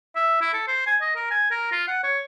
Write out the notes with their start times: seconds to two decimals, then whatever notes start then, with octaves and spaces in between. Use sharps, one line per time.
0.15 E5
0.41 E4
0.53 A4
0.68 C5
0.87 G#5
1.01 D#5
1.16 A#4
1.31 G#5
1.51 A#4
1.72 F4
1.87 F#5
2.03 C#5